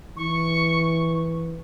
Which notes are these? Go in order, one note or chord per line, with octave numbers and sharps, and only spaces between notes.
E3 C#6